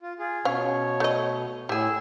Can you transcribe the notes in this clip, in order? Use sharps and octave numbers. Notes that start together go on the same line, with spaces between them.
F4
F4 G#4
B2 C#4 C#5 F5
A3 D#5
A2 G4 G#4 G#5 E6